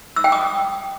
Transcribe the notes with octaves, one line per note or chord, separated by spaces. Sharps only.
E6
G5
D#6